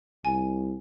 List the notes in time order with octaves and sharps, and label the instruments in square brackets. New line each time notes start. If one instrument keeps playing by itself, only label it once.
[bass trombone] C2 [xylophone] G#5